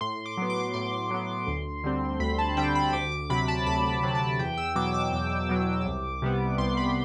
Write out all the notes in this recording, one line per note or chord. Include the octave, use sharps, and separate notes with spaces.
A2 C6
D6
F#3 B3
D6
A2 C6
F#3 B3
D2
D3 G3 C4
D2 B5
A5
D3 G3 C4 G5
B5
D2 D6
D6
C3 F#3 B5
A5
D2 B5
C3 F#3
A5
E2 G5
E6
B2 F#3 D6
D6
E2 D6
B2 F#3
C2
C3 G3 B3
C2 C6
B5